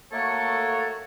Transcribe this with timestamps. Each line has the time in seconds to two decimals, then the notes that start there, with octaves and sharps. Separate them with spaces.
0.12 A3 A#3 F#4 A4 C#5